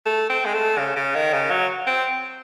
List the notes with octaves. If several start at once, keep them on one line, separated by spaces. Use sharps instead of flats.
A3
C4
G#3
A3
C#3
C#3
D#3
C#3
F#3
C4